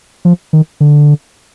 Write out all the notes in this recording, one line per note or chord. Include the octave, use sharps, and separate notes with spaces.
F3
D#3
D3